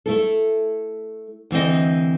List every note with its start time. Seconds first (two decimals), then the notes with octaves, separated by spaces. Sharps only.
0.06 A3 E4 A4
1.51 D2 E3 C4 D#5